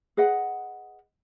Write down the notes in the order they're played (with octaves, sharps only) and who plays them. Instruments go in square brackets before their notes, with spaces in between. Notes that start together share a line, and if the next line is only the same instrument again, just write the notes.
[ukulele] G#4 B4 D#5 F#5